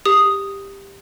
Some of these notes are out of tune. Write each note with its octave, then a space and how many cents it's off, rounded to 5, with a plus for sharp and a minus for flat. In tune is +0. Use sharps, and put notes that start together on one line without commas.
G4 +10 D#6 +0